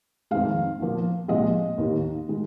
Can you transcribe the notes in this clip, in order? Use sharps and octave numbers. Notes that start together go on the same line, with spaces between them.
F2 D#3 G#3 F5
A#2 F3 A#3
C2 A#2 F3 G#3 D#5
D#2 D#3 A#3
D#3 G#3